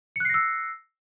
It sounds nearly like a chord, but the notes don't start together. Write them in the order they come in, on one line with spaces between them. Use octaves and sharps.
C#7 F#6 C7 A#6 E6